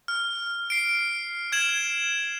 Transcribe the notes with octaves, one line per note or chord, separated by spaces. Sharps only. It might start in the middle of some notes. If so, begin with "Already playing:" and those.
F6
C7 D7
F6 G#6 E7 F#7